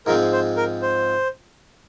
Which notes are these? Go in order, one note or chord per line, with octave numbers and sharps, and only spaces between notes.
G#2 F3 G#3 C4 A#4
C5
A#4
C5